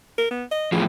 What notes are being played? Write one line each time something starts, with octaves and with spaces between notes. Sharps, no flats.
A#4
B3
D#5
E2 A2 F3 G#4